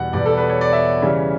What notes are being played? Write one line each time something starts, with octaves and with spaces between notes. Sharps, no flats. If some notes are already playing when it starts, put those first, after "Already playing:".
Already playing: E2 B2 G3 B3 F#5
E2 B2 G3 B3 D5
A4
B4
C#5
D5
E5
C#3 E3 G3 C#4